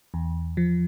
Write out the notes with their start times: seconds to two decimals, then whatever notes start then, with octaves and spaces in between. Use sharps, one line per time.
0.14 E2
0.57 F3